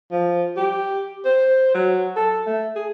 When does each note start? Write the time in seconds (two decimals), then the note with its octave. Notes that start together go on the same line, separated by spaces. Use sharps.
0.11 F3
0.56 G4
1.25 C5
1.74 F#3
2.16 A4
2.46 A3
2.75 G#4